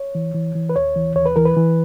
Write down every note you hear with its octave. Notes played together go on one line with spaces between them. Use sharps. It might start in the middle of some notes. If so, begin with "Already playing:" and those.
Already playing: C#5
E3
E3
E3
B4
D#2 C#5
E3
D#2 C#5
B4
E3 A#4
B4
E3